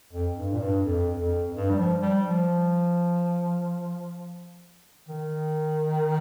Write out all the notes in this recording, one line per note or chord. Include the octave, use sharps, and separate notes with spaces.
F2
G2
A#2
G2
F2
F2
G2
G3
F3
G3
F3
D#3